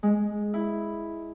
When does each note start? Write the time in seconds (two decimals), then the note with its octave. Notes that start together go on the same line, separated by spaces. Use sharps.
0.03 G#3
0.54 E4